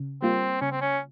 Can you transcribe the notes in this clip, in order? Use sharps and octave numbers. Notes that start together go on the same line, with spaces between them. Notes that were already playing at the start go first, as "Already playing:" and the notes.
Already playing: C#3
G3 A#3 C4 F4
C#3 C#4
C4
C#4